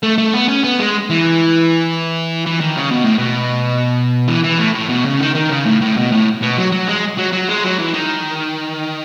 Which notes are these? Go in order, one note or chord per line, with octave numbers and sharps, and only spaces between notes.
A3
A3
B3
C#4
B3
G#3
E3
E3
D#3
C#3
B2
A2
B2
E3
E3
A2
A2
B2
C#3
D#3
D#3
C#3
A2
A2
B2
A2
B2
F#3
F#3
G#3
F#3
F#3
G#3
F#3
E3
D#3